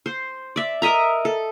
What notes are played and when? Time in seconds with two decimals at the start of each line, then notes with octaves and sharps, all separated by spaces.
0.06 C5
0.56 D5 E5
0.82 A#4 D#5 E5 A#5
1.25 A4